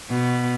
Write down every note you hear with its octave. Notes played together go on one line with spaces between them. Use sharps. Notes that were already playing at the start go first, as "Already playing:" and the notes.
B2